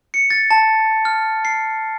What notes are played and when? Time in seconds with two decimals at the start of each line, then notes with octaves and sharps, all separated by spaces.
0.14 C#7
0.31 A6
0.51 A5
1.05 F6
1.45 C7